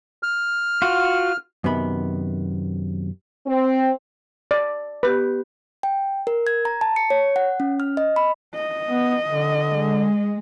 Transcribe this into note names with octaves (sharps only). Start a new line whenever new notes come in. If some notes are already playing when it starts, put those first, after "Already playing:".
F6
F4 F#4
F#2 C3 D#3 B3 B5
C4
D5
B3 G4 B4
G5
A#4
G#6
A#5
A5
C#7
C#5
F#5
C#4
F6
D#5
B5
D#5
B3
D3
G#3